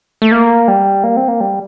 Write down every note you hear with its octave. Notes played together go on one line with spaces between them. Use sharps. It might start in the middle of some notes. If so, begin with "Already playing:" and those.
A3
A#3
G3
A#3
C4
A#3
G3